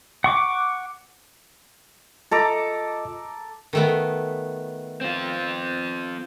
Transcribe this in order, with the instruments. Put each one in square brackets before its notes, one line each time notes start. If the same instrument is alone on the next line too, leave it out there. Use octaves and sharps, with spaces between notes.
[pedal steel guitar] F#5 C#6 D6
[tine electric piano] F4 D#5 [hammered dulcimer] A4 A#5 D6
[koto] D#3 A3 B3
[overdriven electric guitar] C4 F4